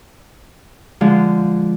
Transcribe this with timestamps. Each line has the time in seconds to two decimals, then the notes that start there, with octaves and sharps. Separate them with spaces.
1.01 D3 F3 G#3